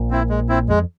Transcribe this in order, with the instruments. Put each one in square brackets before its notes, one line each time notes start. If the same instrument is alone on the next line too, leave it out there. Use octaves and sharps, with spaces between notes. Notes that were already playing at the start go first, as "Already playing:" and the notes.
Already playing: [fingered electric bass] A#1 A#2
[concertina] C4 E4
G#3
C4 E4
[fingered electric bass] F2 [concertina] G#3